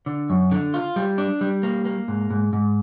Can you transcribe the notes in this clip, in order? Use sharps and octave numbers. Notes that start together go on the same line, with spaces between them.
D3
F#2
D3
F4
G3
D4
G3
A#3
A#3
G#2
G#2
G#2